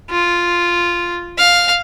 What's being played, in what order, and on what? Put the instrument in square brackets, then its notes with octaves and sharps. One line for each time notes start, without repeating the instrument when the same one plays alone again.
[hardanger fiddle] F4
F5